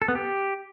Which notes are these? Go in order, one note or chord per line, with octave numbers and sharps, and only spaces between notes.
A4
B3
G4